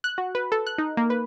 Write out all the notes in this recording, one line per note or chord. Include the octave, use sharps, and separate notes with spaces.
F#6
F#4
B4
A4
F#6
D#4
A#3
B4